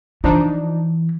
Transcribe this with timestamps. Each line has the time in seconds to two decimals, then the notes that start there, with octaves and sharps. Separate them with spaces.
0.24 E3 F3 D4 D#4